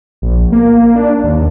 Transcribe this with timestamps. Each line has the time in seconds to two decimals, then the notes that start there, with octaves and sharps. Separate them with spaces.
0.22 A#1
0.52 A#3
0.95 D4
1.24 D#2